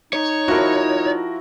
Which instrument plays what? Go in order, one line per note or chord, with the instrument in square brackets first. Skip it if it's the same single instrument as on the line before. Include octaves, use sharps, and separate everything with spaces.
[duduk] D#4 [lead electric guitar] C#5
[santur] F3 E4 [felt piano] F#4 A#4